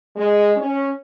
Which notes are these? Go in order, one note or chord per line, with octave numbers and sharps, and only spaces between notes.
G#3
C#4